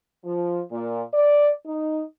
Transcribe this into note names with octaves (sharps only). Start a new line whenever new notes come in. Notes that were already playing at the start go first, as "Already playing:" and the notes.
F3
A#2
D5
D#4